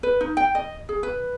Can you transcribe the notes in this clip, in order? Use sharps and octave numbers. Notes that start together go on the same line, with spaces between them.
B4
D#4
G5
D#5
G#4
B4